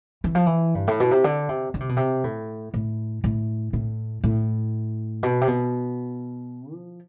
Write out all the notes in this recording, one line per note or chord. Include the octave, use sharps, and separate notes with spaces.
E3
F3
E3
G2
A2
B2
C3
D3
C3
D3
C3
B2
C3
A2
A2
A2
A2
A2
B2
C3
B2
F3